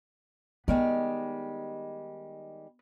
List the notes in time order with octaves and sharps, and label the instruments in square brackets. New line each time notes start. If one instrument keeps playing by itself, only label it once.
[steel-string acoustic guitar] D#3 G3 G#3 [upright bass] B3